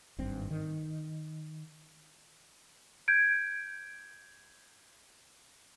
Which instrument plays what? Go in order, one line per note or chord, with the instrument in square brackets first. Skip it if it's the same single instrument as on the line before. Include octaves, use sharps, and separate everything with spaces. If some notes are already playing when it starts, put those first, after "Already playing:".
[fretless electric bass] G#1 G2 C4
D#3
[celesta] G6 G#6 D7